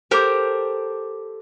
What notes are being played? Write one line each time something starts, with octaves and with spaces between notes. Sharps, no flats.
G4 A4 A#4 C5 D6